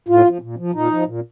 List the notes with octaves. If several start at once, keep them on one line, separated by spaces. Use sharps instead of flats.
A2 F4
F3
A#2
F3
A#2 D#4
F3
A#2